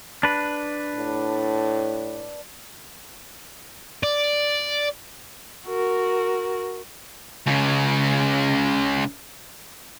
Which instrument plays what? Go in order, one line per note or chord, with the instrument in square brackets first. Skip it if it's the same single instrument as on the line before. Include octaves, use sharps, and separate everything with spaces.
[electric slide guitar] D4 B4
[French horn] A2
[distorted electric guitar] D5
[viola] F#4 A#4
[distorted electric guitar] C#2 C#3